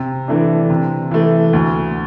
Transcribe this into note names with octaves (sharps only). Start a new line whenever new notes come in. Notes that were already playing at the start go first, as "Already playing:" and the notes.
Already playing: C3
E3 A3 D4
C3
E3 A3
D2